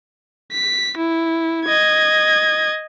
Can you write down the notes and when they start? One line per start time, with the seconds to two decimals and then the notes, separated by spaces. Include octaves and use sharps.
0.53 B6
0.98 E4
1.66 D#5 G#6